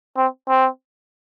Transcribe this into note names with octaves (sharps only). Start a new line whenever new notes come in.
C4
C4